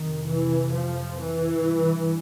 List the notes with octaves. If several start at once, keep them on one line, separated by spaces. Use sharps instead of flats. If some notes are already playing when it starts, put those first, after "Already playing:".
Already playing: F2 C3 D#3
E3
F3
E3
G2